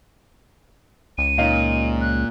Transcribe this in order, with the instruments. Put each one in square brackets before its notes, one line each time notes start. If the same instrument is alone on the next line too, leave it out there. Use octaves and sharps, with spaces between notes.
[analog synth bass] C#2 [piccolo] D#7
[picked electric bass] A#2 [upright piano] D#4 C#5 F5
[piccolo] F#6